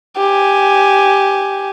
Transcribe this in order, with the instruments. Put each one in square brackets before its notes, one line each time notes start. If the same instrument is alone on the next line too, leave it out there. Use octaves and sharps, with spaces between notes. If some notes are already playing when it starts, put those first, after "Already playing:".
[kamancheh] G4 G#5